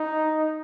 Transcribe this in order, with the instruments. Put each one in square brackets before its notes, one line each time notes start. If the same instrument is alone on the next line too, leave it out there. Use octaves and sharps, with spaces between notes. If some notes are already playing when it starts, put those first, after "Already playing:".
Already playing: [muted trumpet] D#4